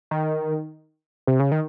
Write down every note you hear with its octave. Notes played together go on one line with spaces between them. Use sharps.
D#3
C3
C#3
D#3